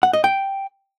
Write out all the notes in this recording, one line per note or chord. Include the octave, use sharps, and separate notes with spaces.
F#5
D#5
G5